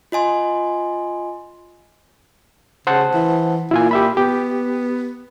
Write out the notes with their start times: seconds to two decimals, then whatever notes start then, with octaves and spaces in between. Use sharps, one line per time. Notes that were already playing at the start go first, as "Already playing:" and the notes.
0.12 F4 D#5 G#5 C6
2.87 C#3 C5 F#5 A5
3.14 E3
3.71 A#2 E4 F4 G#5
3.91 G4 E5 B5
4.17 B3 G4